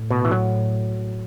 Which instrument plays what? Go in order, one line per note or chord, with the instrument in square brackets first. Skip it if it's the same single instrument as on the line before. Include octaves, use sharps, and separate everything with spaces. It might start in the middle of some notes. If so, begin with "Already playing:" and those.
Already playing: [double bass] A2
[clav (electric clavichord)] B2
E3
F#3